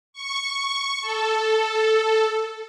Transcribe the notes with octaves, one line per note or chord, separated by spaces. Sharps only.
C#6
A4